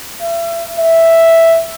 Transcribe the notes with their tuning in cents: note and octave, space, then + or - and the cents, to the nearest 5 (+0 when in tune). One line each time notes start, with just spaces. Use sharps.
E5 +35
E5 +0